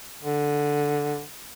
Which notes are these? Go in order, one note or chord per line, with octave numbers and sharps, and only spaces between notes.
D3